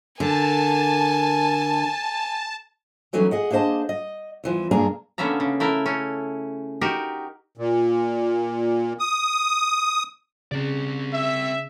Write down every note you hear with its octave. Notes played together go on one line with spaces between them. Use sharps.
D3 A#4 G#5 A5
E3 F#3 A3 C#4 D#4
G#4 D#5 F#5
A#3 D4 G#4 C5 D#5 A5
D#5
E2 E3 F3
G2 C3 A#3 D4 G#4 A#5
D3 A#3 B3 C#4 E5 A#5
C#3
A3 E4 A#4
A3 C#4
D#4 F#4 G4 A#4
A#2
D#6
C#3 C4 D5
E5